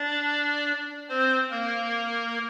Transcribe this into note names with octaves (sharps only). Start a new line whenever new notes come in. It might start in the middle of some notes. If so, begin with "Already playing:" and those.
Already playing: D4 D5
C4 C5
A#3 A#4